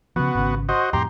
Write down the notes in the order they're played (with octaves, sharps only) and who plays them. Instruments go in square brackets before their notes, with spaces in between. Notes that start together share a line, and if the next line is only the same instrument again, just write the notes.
[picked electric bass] C#3 F3 [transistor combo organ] B3 F#4
[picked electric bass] G#1 C#3
[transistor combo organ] F#4 C5 D#5
[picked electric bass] F2 A2 [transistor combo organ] G4 A#5 C6